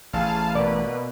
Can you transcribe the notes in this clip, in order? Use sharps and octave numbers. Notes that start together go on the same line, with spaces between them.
A1 G#4 F5 A5
B2 A#3 B4 D5